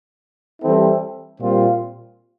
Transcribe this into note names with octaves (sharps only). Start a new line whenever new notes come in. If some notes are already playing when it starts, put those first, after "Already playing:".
E3 G3 C4 E4 A4
A#2 G3 C4 F4